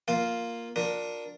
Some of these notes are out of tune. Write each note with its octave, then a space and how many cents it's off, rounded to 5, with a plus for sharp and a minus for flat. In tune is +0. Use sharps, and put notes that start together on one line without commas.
A#3 +0 F4 +0 F5 +0
D4 +0 F4 +35 A#4 +0